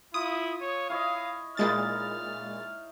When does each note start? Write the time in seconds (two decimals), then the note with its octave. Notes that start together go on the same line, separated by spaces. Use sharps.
0.14 E4 F4 D#6
0.61 C#5
0.89 E4 C#5 D#5 F5
1.57 A#2 G#3 D#4 E4 F6 A6